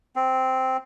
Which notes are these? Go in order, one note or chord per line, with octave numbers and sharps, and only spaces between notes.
C4